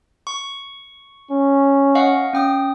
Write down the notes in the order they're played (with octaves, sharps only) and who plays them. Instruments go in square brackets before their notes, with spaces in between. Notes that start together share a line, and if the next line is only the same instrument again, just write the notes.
[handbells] C#6
[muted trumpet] C#4
[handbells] D#5 F5 F#5
C#4 G5 D#6